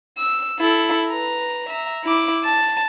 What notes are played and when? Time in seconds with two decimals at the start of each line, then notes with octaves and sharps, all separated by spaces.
0.18 E6
0.60 E4 A4
1.09 B4 A#5
1.69 E5 A#5
2.05 E4 D6
2.44 A5